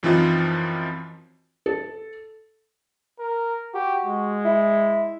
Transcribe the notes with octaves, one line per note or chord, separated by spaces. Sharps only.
F#2 E3 F3 C4 D#4 F4
A4
A#4
F#4 G4
G#3
E4